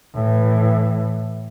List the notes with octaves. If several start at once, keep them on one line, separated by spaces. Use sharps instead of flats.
A2 E3